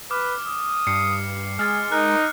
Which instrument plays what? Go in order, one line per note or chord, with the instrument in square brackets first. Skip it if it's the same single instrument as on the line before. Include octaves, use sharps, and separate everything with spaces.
[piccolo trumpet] B4 [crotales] D6 F6
[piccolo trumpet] D#6
[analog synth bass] G2 [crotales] C7 C#7
[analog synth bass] G#3 [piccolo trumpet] G#4 [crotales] F6 A6
[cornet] D#4 [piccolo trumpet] A#4 [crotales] F#6